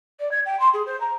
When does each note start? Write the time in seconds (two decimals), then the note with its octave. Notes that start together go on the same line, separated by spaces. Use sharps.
0.19 D5
0.31 G#6
0.45 G5
0.59 C6
0.73 G#4
0.86 C5
1.00 A#5